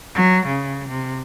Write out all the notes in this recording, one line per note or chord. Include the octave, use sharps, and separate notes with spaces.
F#3
C#3
C3